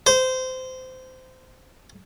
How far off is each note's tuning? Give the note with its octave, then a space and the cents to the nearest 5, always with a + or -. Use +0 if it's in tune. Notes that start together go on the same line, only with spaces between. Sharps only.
C5 -20